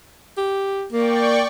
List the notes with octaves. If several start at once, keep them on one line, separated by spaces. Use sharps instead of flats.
G4
A#3 D5 G5 C#6